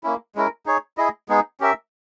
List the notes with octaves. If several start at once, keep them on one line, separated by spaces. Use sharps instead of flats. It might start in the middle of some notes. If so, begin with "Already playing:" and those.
A#3 C#4 E4
G#3 C#4 E4 A#4
D#4 G#4 C#5
E4 G#4 D#5
G#3 B3 D#4 G#4
C#4 G4 A#4 E5